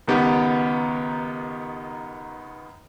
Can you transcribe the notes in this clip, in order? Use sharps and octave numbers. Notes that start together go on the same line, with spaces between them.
C#2 D#3 B3 G4